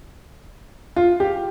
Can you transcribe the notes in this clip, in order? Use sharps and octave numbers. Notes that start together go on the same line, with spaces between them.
F4
G4